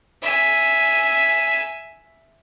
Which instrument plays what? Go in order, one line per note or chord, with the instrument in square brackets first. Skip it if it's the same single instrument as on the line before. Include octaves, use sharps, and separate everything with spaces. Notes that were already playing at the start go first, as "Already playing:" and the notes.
[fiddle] E5 G#5